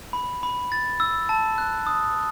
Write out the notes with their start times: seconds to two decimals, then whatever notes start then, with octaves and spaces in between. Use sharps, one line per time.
0.13 B5
0.43 B5
0.72 A6
1.00 E6
1.29 A5
1.58 F#6
1.87 D#6